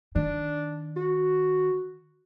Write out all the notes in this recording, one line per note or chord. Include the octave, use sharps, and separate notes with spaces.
D#3 D4
F#4